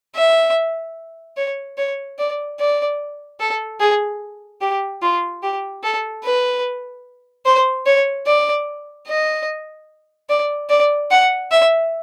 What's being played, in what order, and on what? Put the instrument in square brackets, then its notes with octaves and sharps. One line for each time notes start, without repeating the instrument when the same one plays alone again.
[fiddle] E5
C#5
C#5
D5
D5
A4
G#4
G4
F4
G4
A4
B4
C5
C#5
D5
D#5
D5
D5
F#5
E5